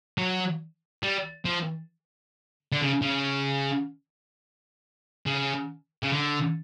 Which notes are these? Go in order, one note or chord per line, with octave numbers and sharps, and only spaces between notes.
F#3
G3
F3
D3
C#3
C#3
C#3
C#3
D3